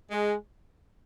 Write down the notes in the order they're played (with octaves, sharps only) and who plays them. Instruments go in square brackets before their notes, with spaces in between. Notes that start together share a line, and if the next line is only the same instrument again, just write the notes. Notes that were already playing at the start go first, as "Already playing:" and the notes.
[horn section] G#3